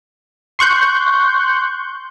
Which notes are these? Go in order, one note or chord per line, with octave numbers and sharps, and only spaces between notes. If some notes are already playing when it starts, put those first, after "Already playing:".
C6 C#6 F#6 G6